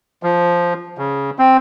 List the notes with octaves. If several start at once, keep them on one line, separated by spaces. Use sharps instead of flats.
F3
C#3
C4